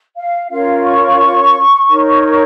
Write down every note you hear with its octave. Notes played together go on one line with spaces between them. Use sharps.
F5
C#4 F4 A#4 C#5 F5
C#6
D#4 A#4 C#5